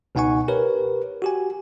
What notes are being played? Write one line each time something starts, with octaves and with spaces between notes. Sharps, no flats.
C#2 B2 D#4 F#5 G#5 C#6
G4 A#4 B4 C#5
F#4 G4 G#5